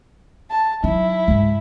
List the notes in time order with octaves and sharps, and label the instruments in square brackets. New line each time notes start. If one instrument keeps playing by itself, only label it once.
[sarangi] A5
[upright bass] F#3 D#4 [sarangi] E4
[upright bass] C#2 G#2